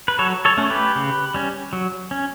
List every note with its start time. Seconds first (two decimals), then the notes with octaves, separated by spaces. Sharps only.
0.08 B4
0.19 F#3 A4 C#5
0.45 A4 C#5
0.57 A3 C#4
0.70 G4 B4
0.95 C#3
1.34 G3 C#4
1.73 F#3
2.11 C#4